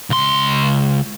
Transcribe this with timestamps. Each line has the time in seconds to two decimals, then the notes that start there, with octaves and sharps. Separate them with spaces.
0.10 C#2 C6